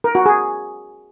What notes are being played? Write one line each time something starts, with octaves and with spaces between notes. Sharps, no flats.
A#4
F#4
G#4